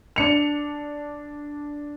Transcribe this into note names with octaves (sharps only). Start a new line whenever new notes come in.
D4 C#7 F7